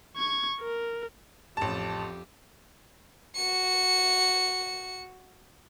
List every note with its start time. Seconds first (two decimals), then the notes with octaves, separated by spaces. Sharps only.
0.16 C#6 G#6
0.61 A#4
1.57 A1 F2 G4 A5
3.36 F#4 C#7